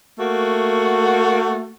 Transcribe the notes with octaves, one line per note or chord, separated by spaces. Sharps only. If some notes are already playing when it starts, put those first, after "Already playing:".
A3 A#3 F#4